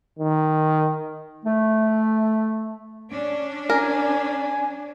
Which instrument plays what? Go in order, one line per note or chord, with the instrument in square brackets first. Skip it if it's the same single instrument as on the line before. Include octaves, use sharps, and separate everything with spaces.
[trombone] D#3
[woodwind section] A3
[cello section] C#4 D4
[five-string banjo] A#4 [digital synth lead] G#5